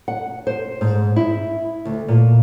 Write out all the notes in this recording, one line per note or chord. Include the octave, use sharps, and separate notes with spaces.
F#5
C5
G#2
E4
D2
A#2